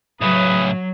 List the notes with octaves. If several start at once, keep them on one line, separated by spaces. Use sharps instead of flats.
A2 C#3 F#3 B4 D#6